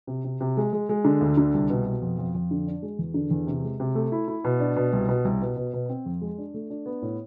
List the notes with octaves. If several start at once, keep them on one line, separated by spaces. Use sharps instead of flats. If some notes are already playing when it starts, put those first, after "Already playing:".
C3
C3
C3
G#3
G#3
G#3
D3
D2
D3
C2
B2
B2
F2
F2
F2
D3
D4
G#3
E2
D3
E2
C3
G#3
C3
A3
E4
E4
B2
D4
B2
C2
B2
C2
B2
B2
B2
C4
F2
G#3
D4
A3
D4
B3
A2